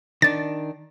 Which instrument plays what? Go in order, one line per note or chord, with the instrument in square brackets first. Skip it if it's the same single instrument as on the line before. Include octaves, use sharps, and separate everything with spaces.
[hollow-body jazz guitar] D#3 D4 [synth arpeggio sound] A6